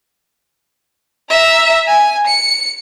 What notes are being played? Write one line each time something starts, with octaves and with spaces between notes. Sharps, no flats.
E5 A#5
G#5
C#7